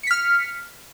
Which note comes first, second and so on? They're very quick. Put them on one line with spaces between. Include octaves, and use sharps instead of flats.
C#7 B6 F6